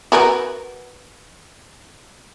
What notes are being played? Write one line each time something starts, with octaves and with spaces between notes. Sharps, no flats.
F#4 A#4 B4